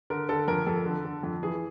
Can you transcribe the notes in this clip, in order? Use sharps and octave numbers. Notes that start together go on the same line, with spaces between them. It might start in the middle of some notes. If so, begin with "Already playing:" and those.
D3 A#4
D3 A4
F2 A#4
F2 A4
D3
D3
F2
E3 G#4